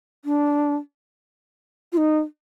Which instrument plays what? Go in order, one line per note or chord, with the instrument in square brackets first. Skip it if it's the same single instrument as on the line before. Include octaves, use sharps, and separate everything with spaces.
[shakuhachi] D4
F4
D#4